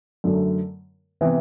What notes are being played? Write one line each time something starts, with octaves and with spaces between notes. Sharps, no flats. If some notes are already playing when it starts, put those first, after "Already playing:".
F#2 D3 F#3 A3
C3 E3 B3